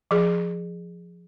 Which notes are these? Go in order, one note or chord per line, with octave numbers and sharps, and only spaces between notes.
F3 G#4